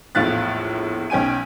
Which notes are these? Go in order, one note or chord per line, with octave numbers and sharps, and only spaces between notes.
A#1 E2 A2 F5 F#6 A6
B1 C#4 G5 G#5 D#7